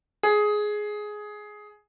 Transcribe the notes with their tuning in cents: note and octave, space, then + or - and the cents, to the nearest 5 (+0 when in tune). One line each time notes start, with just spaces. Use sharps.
G#4 +10